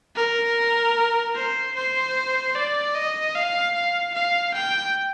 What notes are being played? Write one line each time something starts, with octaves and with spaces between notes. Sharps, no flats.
A#4
C5
C5
D5
D#5
F5
F5
F5
G5